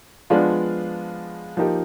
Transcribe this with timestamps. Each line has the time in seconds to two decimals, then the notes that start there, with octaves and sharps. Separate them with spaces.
0.30 F3 G#3 B3 D4 F4
1.57 F3 A#3 D#4 G4